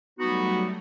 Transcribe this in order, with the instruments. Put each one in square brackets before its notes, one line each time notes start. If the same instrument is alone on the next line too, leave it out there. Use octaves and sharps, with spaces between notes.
[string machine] F#3 G3 A3 [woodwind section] B3 D#4 F#4